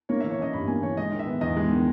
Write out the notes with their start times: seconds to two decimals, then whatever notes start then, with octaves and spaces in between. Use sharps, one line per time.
0.09 A#3 C#5
0.20 E3 E5
0.31 C#5
0.39 C#4 D#5
0.53 G2 B5
0.68 A#3 G#5
0.82 E3 C#5
0.97 G#3 D#5
1.12 D#3
1.19 E5
1.27 B3
1.41 E2 D#5
1.57 G#3
1.71 D#3